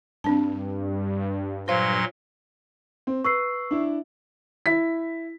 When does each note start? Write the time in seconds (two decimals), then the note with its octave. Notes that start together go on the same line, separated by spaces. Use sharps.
0.24 G2 C4 D4 A5
1.68 A#2 F#3 C5 F5 C6
3.07 C4
3.24 B4 C#6 E6 C7
3.71 D4 E4
4.66 E4 B6